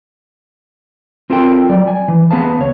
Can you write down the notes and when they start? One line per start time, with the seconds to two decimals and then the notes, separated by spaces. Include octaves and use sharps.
1.30 C4 F4 A4 A#4 D5 G5
1.69 F#3 D5
1.88 G#5
2.08 E3
2.31 B3 G#4 B4 F5 A5
2.59 C#2 C#5